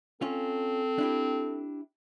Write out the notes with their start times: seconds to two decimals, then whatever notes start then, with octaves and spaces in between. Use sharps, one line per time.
0.22 C4 C#4 F4 A4
0.98 D4 E4 G4